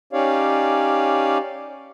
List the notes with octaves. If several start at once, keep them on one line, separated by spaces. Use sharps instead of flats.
C#4 D#4 G4 C#5 D5 F5